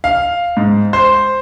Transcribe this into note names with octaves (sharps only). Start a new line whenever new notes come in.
F5
G#2
C5